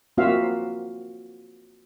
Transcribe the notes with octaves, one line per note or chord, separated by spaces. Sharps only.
A#3 C4 F4 F#4 E5 F5